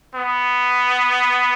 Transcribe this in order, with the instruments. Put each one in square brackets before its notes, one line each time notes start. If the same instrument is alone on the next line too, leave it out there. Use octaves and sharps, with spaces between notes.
[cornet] B3